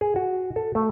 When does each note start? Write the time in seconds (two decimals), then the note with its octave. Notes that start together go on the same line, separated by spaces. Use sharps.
0.01 G#4
0.16 F#4
0.56 A4
0.75 A3